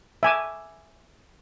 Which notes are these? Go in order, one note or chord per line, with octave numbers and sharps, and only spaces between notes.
E5 G#5 D6